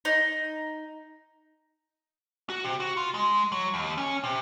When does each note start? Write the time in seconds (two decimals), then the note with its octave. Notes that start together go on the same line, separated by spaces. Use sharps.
0.05 D#4
2.50 F#4
2.65 C3
2.80 F#4
2.97 F4
3.14 G#3
3.52 F#3
3.74 D#2
3.98 C#4
4.24 C3